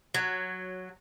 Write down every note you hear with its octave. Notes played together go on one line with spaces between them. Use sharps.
F#3